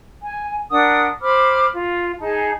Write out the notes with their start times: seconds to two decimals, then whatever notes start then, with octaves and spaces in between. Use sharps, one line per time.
0.22 G#5
0.70 D4 A#4 F#5 D#6
1.21 C5 B5 D6 F6
1.73 F4
2.20 D#4 G#4 A5